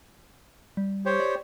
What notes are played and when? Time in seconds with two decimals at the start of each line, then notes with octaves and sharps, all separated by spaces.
0.77 G3
1.06 G4 C5 C#5
1.20 D5